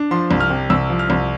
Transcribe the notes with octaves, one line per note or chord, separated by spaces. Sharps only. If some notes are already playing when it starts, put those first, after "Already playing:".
Already playing: D4
F3 C6
C2
F6
C3
C2 E6
F3
F6
C2